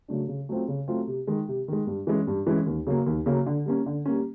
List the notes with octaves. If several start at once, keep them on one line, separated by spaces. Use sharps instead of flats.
C#3 F#3 A3 D4
C#3
F#3 A3 C4 F4
C#3
F#3 A3 C4 F4
C3
D#3 G#3
C3
D#3 G#3
G2
E3 G#3 C#4
G2
E3 G#3 C#4
D#2
C#3 F#3 A#3
D#2
C#3 F#3 A#3
D3
G3 A#3 C#4
D3
G3 A#3 C#4